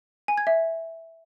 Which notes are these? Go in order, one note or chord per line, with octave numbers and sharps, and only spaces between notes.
G#5
G#6
E5